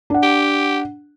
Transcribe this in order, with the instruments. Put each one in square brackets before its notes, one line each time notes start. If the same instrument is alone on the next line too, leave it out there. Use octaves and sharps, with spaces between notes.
[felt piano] D4 F#5
[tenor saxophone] G4